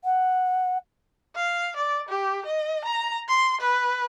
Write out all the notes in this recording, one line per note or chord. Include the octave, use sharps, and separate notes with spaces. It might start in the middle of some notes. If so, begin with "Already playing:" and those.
F#5
F5
D5
G4
D#5
A#5
C6
B4